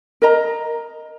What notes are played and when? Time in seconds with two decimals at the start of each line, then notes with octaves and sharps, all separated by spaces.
0.22 A#4 D#5 A#5